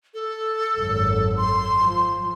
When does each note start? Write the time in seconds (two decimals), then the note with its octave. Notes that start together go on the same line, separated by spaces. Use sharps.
0.14 A4
0.77 G#1 F#2
1.37 C6
1.83 F3